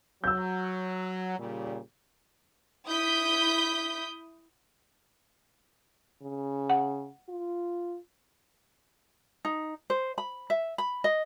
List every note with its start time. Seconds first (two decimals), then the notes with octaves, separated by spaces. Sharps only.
0.24 F#3 E6 G6
1.38 A#2 C#3 G3
2.87 E4 D#6 G6 B6
6.22 C#3
6.70 F#5
7.29 F4
9.45 D#4
9.90 C5
10.18 B5
10.50 E5
10.78 B5
11.04 D#5